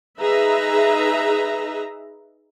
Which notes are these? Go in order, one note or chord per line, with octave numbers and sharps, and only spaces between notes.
D#4 G#4 B4 E5 A#5